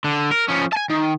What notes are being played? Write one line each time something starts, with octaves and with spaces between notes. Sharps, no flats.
D3
A#4
F3 C#4
G#5 A5
D#3